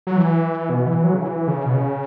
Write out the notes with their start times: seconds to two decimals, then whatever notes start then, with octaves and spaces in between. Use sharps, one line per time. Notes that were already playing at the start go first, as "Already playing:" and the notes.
0.07 F#3
0.16 E3
0.69 B2
0.87 E3
1.04 F#3
1.14 C#3
1.22 E3
1.48 C#3
1.66 B2
1.74 C#3